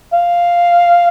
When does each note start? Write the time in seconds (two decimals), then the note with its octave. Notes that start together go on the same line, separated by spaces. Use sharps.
0.13 F5